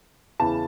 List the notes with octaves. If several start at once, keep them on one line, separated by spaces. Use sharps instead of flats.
E2 C#3 E3 A5